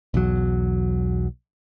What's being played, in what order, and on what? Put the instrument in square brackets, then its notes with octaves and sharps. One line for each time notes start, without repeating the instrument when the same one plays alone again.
[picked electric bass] B1 E2 F#3